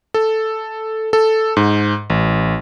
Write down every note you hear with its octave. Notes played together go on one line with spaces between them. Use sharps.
A4
A4
G#2
A1